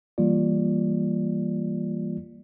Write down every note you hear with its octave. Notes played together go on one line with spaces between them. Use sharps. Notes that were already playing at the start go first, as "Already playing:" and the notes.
E3 G3 A#3 F4 D5